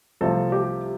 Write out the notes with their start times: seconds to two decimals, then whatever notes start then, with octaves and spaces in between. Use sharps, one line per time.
0.21 C2 C3 F3 A3 A4
0.52 G4